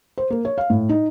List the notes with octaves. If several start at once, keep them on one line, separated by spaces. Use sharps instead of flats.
C5
A#3
C#5
F5
A2
D#4